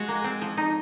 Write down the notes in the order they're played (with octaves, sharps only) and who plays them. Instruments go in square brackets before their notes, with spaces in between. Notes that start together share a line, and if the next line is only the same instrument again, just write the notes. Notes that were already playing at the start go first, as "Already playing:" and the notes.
Already playing: [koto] F3 C#4 F#4 [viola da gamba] G#3
[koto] A#3
C4
F3
D#4